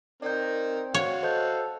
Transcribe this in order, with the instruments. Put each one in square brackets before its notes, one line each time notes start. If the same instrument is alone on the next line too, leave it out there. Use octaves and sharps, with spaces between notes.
[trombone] C4 [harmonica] D#4 A#4 [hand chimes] D5 G6
[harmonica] F#4 F5 [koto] C#5
[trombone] A4 [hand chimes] C5 D#5 G6